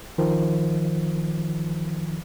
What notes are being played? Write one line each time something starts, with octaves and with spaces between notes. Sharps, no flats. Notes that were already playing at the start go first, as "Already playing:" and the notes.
D#3 F3